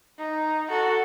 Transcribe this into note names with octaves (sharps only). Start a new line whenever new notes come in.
D#4
F#4 A4